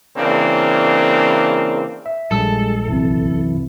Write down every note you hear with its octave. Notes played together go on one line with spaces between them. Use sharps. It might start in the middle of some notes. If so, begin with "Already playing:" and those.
C#3 E3 A#3 C4 D4
E5
A#1 G3 G#3 A4 E6
C2 F#2 E3 C4